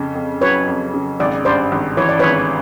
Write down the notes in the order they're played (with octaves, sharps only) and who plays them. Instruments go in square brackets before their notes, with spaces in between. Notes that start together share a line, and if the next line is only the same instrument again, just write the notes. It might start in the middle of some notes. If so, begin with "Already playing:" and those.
Already playing: [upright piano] F2 C#3
F2
[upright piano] F#3 [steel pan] B4 C#5
[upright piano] F2
C#3
[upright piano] G#1 [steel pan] D5
[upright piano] G2 [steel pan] C5 D5
[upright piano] G#1
[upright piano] E3 [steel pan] C#5
[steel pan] D5
[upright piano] G#1 [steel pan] B4 C#5